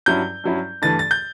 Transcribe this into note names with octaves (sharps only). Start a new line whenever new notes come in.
G2 F#3 C#4 E4 G6
G2 F#3 C#4 E4
G2 E3 A3 D4 A6
A6
G6